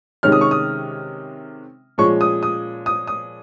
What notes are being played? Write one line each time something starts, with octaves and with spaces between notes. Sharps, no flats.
C3 D#3 G#3 C#4 F6
D#6
C#6
D#6
A#2 F3 G#3 C#4 C#6
D#6
D#6
D#6
D#6